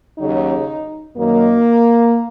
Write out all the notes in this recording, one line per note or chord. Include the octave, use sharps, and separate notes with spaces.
D#2 C#3 F#3 D#4
F#2 D#3 F#3 A#3